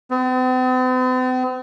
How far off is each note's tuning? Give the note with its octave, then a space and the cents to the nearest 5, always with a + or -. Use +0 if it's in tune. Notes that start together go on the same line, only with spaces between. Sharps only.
C4 -45